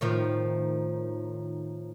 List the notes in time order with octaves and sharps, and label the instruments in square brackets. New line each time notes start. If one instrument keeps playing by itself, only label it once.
[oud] A2 D#3 F3